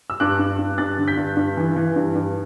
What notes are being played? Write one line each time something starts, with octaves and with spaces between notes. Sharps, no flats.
E6
G2 D6 F#6
G2
G2
G2 F#6 A6
D3
G6 B6
G2
G2
E3
E3
G2
G2